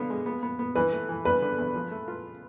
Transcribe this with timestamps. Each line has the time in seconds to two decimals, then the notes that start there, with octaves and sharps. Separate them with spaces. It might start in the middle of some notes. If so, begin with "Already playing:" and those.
Already playing: D3 B3 F5
0.10 G#3
0.26 B3
0.43 B3
0.59 B3
0.75 E3 B4
0.92 A3
1.09 E3
1.25 E2 B4
1.42 D3
1.58 E2
1.75 F3
1.91 A3
2.08 F4